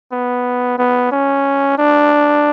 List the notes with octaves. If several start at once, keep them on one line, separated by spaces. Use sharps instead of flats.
B3
B3
C#4
D4